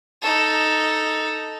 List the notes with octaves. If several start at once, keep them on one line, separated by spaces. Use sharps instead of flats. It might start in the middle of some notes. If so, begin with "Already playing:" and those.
D#4 A4